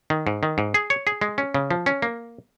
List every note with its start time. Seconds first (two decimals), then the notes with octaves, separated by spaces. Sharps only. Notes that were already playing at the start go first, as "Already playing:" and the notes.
0.10 D#3
0.27 G#2
0.43 D#3
0.58 G#2
0.74 G#4
0.90 C#5
1.07 G#4
1.21 G#3
1.38 C#4
1.54 C#3
1.71 F3
1.86 C#4
2.02 A#3